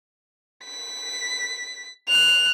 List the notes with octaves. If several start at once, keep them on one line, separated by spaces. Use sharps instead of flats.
B6
F#6 F7